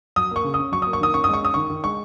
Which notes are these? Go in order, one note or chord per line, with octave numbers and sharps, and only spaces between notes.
F#3 D#6
A#3 C#6
C#3
C#4 D#6
F#3 C#6
A#3 D#6
C#6
D#3 D#6
C#4 C#6
G#3 D#6
C#6
C#4 D#6
D#3 C#6
D#3
G#3 C#6